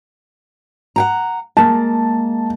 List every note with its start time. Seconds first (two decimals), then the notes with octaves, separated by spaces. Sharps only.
0.96 F#5 G5 A#5
1.57 G#3 A#3 A5